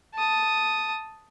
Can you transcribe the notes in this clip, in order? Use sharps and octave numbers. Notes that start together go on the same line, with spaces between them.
A5 D#6